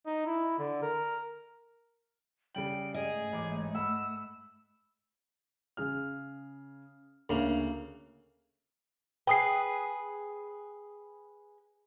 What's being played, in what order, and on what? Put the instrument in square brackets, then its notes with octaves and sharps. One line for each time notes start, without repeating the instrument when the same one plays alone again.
[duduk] D#4
E4
D3
A#4
[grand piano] C#3 G3 F#7 [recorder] G5
[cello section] G#2 A3 [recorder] G#4 [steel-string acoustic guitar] D#5
[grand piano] A1 D6
[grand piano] F#5 B5 F6 [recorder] E6
[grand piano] C#3 G#4 F6
[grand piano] D2 [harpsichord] C#3 A#3
[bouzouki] G#4 B4 [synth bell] G5 D#6 C7